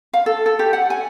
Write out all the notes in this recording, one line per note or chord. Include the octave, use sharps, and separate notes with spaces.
F5
A4
A4
G4
F#5
G#5